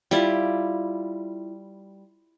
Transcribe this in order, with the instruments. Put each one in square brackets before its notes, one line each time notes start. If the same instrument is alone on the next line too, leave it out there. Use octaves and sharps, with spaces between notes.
[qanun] G3 E4 F4